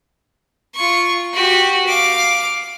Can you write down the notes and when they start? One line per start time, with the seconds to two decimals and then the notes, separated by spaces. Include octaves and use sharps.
0.76 F4 C#6
1.34 F#4 G4
1.87 F5 D6